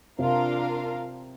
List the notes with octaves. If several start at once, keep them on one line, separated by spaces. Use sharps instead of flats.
C3 D4 F4 A#4 F5